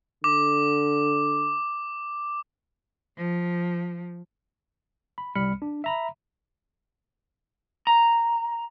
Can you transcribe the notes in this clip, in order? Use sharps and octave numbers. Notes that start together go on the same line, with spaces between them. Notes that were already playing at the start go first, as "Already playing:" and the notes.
D3 D6
F3
B5
C2 G3 B5 F6 C#7
D4
E5 A#5 B5
A#5